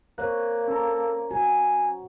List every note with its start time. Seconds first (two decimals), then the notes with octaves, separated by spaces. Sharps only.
0.18 A#3 C5 C#5 F#6
0.68 C#4 A4 A#5
1.31 F#4 G#5